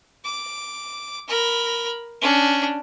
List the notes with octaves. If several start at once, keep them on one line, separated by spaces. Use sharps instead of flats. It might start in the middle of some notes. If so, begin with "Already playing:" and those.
D6
A#4 B5
C#4 D4